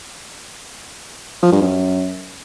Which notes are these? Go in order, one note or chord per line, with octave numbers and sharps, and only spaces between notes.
F3
G2
F#2